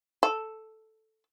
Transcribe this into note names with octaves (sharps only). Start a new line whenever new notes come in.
A4